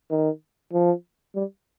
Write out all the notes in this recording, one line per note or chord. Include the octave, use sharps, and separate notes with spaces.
D#3
F3
G3